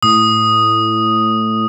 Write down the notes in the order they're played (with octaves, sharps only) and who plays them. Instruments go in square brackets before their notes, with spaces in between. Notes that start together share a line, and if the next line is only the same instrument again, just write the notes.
[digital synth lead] A2 [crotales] D#6